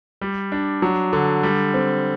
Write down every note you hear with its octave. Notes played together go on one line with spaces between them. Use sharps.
G3
D4
F#3
D3
G3
C4